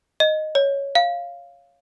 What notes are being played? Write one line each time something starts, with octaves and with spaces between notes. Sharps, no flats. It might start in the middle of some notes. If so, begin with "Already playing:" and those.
D#5
C#5
F5